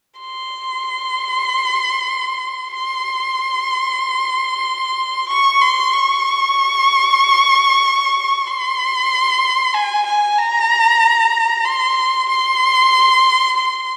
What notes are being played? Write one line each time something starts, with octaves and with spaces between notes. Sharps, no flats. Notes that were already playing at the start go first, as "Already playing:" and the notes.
C6
C6
C#6
C6
C#6
C6
G#5
G#5
A#5
C6
C6
C6